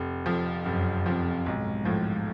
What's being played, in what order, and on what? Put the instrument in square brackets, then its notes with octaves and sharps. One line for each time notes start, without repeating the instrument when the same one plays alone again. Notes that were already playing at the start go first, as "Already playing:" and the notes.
Already playing: [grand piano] F1
F2 F3
[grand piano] F1 [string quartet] F#2
[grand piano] F2 F3
[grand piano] B1 [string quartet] G#2
[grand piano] A2 F3